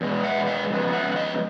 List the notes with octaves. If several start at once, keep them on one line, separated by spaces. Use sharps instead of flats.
E2 B2 G#3
E5 F#5
D#5 F5
F2 C#3 G#3 B3
E5 F#5
F#5
D#5 F5